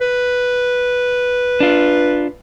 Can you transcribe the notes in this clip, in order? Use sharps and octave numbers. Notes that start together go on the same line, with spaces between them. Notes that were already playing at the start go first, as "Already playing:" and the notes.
B4
D4 F4